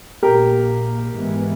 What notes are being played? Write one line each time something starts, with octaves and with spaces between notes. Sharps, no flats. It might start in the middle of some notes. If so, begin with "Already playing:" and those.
A#1 A#2 A#3 G4 A#4
G#2 E3 G#3 B3